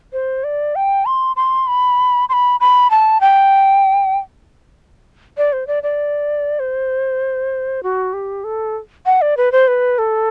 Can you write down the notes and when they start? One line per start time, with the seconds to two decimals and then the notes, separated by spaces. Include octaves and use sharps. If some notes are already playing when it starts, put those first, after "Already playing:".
0.13 C5
0.44 D5
0.76 G5
1.06 C6
1.36 C6
1.67 B5
2.29 C6
2.33 B5
2.60 B5
2.91 A5
3.21 G5
5.37 D5
5.53 C5
5.67 D5
5.83 D5
6.60 C5
7.83 F#4
8.14 G4
8.44 A4
9.06 F#5
9.22 D5
9.37 B4
9.52 C5
9.68 B4
9.98 A4